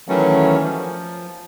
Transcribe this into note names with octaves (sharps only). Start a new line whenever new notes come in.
D#3 E3 F#3 A3 C#4
F3